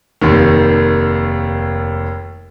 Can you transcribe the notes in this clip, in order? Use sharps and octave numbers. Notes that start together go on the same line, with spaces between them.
F1 D#2 D#3